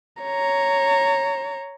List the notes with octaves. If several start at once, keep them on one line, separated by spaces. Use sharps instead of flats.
C#5 A#5